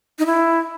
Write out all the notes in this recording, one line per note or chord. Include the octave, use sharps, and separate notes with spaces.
D#4
E4